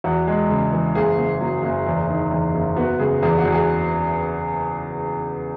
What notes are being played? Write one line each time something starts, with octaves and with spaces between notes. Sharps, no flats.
E2 F#4
G#3
C#3
E3
F#1 G#4
F#1
F#3
F#1
E2
D#3
E2
F#1
B3 F#4
C#3 G#4
E2 G#4
F#4
E2
G#4